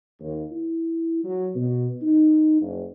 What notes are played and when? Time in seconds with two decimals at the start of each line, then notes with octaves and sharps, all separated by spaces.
0.21 D#2
0.52 E4
1.24 F#3
1.55 B2
2.03 D#4
2.61 F#1